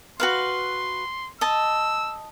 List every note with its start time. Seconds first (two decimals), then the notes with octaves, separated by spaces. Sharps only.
0.20 F#4 B4 F5 C6
1.41 D#5 A5 E6